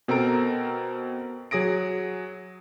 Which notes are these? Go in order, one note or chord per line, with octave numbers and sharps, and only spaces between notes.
B2 C4 A4 A#4 A#5 D7
F#3 G#4 D#6 A#6 D7